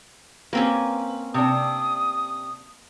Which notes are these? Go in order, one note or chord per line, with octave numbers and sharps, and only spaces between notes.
A#3 C4 C#4 B4
C3 D4 D#6